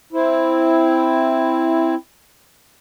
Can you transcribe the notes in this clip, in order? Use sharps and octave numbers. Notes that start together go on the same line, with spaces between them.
C4 E4